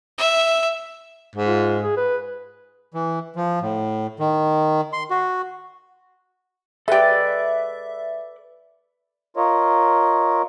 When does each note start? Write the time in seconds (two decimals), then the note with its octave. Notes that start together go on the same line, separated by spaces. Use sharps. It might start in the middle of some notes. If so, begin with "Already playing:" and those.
0.18 E5
1.35 G#2
1.47 F4
1.84 G#4
1.97 B4
2.94 E3
3.36 F3
3.62 A2
4.19 D#3
4.93 C6
5.10 F#4
6.88 G#3 G4 A4 B4 D5 E5
9.37 F4 A#4 C#5 D#5